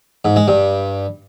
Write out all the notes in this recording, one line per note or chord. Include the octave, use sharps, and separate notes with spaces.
G#2
G#3
G2